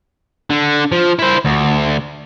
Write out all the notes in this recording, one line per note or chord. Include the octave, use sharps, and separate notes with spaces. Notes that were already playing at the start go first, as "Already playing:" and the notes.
D3
F3
E4 C5
D2